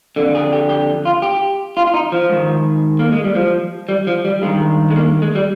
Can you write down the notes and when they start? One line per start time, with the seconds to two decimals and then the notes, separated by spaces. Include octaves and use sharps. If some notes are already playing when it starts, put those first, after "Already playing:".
0.16 F2 D3
0.35 G#4
0.53 G4
0.69 G4
1.05 F4
1.22 G4
1.77 F4
1.87 F4
1.94 D#4
2.12 F3
2.30 G#2 D#3
2.99 A#3
3.12 G#3
3.24 G3
3.35 F3
3.89 G3
4.07 F3
4.25 G3
4.42 G2 D#3 G#3
4.91 G#3
4.96 A#3
5.22 G#3
5.35 G3